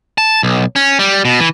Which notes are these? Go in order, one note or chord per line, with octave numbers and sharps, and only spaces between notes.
A5
B1
C#4
G3
B2
E3